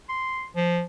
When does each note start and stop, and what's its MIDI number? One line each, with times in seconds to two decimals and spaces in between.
0.09 0.46 84
0.56 0.82 53